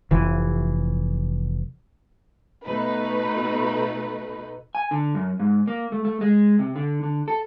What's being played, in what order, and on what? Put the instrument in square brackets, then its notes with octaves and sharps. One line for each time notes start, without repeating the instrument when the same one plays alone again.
[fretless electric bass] F1 E3
[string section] B2 A3 D#4 B4
[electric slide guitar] G#5
D3
F#2
G#2
A#3
A3
A3
G#3
C3
D3
D3
A4